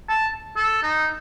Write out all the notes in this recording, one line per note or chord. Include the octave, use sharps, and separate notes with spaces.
A5
A4
D#4